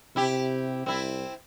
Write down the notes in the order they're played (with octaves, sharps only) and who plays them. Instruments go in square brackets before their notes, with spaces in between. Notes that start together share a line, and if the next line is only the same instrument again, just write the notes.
[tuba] C3 [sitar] E4 G4
[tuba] C2 [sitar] C4 E4